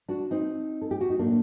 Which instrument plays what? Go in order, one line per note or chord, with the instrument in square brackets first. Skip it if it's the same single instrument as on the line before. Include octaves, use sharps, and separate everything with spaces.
[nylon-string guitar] D4 F#4
C4 D#4
A4
G4
F#4
D#4
A2 F#3 A3 A#3 D4